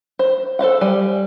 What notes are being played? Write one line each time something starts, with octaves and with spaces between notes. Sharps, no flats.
C5
A4 C5 F5 F#5
G3 G#5